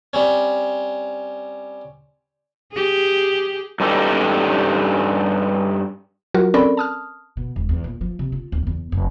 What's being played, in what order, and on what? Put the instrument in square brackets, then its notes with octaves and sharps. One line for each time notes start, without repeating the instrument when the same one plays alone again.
[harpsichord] G3 C4 C#4
[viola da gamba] G4 G#4
[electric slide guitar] G2 G3 C#4 D#4 G4 A4
[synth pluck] F#3 F4 F#4 A#4
C4 C#4 A4 A#4 D5 B5
A5 D#6 F6
[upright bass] B2
E1
E2
A#2
F3
C3
F4
D1
E2
F1